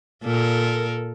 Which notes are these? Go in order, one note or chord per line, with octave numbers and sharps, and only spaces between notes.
A#2 A4 A#4